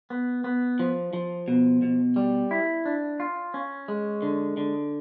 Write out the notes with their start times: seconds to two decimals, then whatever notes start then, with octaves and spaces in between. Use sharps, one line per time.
0.10 B3
0.44 B3
0.79 F3
1.13 F3
1.48 B2
1.82 B2
2.16 G3
2.51 E4
2.86 D4
3.20 F4
3.54 C#4
3.88 G#3
4.22 D3
4.57 D3